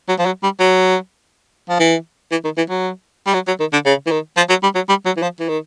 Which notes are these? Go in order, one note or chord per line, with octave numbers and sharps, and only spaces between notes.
F#3
F3
F#3
G3
F#3
F3
E3
E3
D#3
E3
F#3
G3
F#3
F#3
D#3
D3
C#3
E3
D#3
F3
F#3
G3
F#3
G3
F#3
E3
F3
E3
D#3